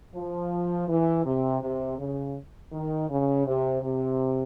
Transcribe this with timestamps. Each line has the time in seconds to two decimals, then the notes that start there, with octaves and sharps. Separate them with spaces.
0.15 F3
0.89 E3
1.25 C3
1.62 C3
1.98 C#3
2.73 D#3
3.10 C#3
3.47 C3
3.83 C3